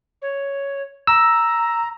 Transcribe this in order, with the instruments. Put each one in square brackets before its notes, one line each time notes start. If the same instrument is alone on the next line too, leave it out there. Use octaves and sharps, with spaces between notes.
[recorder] C#5
[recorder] A#5 [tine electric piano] E6